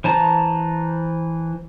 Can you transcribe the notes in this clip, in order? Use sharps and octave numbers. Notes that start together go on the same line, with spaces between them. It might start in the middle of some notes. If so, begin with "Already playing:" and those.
E3 C5 A5 A#5